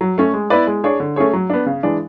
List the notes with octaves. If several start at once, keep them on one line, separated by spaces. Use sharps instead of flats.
F#3
A3 C#4
G#3
B3 E4 B4 D5
G#3
D4 G#4 C#5
D3
A3 C#4 G#4 C#5
F#3
B3 D4
C#3
E3 G#3 D4